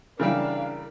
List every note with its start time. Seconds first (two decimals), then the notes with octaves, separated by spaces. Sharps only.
0.20 C#3 E3 G3 D4 A#4 F5